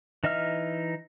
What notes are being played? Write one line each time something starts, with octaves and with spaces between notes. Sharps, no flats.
E3 D#4 D#5 E5 F6